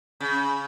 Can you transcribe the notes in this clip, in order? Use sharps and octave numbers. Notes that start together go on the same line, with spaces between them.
C#3